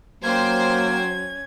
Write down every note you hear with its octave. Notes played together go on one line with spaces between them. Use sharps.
F#3 A#3 C#4 C5 G5 C6 G#6